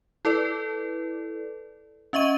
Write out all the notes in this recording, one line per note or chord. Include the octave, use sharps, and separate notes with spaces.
E4 A4 B4 D5
C#4 D#5 E5 C#6 D#7